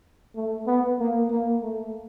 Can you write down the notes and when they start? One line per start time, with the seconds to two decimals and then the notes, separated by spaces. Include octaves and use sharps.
0.35 A3
0.67 B3
0.99 A#3
1.30 A#3
1.62 A3